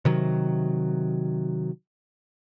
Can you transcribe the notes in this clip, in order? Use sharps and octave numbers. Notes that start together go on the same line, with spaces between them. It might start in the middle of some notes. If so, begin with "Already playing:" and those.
C3 D#3 F#3